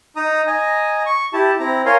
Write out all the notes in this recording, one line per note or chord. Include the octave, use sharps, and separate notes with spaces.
D#4 A#5 D#6
D#5 G#5 A#5
C#6
E4 G4 A5
C4 E4 A#5
A#4 C#5 F5 G#5 A#5 C6